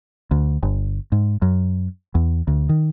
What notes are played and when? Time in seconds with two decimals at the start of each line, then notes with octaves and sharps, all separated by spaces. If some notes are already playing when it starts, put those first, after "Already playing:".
0.31 D2
0.63 G1
1.12 G#2
1.42 F#2
2.15 E2
2.47 D2
2.69 D#3